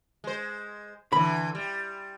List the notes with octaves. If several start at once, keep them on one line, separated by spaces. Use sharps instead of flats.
G#3 C5
D3 E3 B5
G3